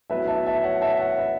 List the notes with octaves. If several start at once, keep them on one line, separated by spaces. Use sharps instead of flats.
A2 F#3 B3 B4 E5
E5 A5
E5 A5
C#5 F#5
E5 A5
C#5 F#5
B4 E5